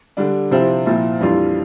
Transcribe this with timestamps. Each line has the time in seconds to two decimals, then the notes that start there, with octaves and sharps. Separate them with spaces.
0.17 D3 G3 D4
0.51 C3 F3 C4 E4
0.86 A#2 F3 C4 E4
1.21 F2 E3 G3 D4 F4